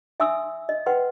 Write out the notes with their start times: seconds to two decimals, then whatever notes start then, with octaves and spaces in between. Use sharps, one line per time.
0.20 E5 G#5 C6 D#6 E6
0.69 D#5
0.86 B4 F#5 G5 C6